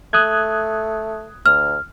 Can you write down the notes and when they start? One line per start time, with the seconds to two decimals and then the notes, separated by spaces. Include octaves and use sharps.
0.13 A3 D#6 F#6 G#6
1.46 D2 F6